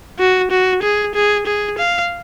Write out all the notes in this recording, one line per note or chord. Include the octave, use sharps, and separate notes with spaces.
F#4
F#4
G#4
G#4
G#4
F5